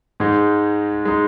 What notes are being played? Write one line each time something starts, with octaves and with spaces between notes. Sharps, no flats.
G#2 G#3 D#4
G#3 D#4